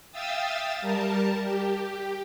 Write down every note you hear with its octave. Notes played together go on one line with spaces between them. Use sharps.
E5 F5 G5 D#6 E6 A6
G3 A#4 A5
G4